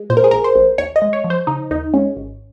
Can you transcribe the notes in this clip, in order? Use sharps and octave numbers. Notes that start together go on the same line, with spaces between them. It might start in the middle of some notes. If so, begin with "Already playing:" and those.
Already playing: G#3
A#2 C5
A#4
G#4
A#1 A#4
C5
A#1
D#2 C#5
D#5
G#3
C#5
F3
C5
C#3 D#4
D#2 D#4
G#3 C#4
G#1